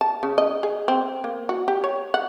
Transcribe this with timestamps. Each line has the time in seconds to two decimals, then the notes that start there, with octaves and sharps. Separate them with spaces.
0.01 A5
0.23 C#3
0.38 D#5
0.63 G#4
0.88 C4
1.24 A#3
1.49 F#4
1.68 G4
1.84 C#5
2.14 F#5